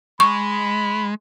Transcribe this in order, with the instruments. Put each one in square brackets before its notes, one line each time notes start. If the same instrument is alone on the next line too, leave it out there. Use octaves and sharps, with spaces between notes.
[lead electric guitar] G#3 [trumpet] B5 [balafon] C#6